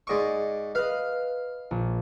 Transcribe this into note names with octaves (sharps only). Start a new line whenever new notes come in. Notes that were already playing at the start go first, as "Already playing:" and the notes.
G#2 D5 D#5 C#6 D6
B4 D#5 F5
A#1